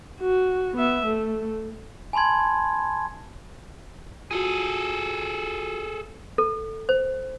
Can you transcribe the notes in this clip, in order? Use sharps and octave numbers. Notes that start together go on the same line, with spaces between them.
F#4
B3 E5
A3
G#5 A5 B5 C6 G#6
F4 F#4 G#4 A4
A4
C5